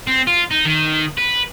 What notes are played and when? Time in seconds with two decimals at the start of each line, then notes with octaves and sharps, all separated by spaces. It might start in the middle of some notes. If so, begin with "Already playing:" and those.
0.07 C4
0.27 F4
0.51 D#4
0.65 D#3
1.18 B4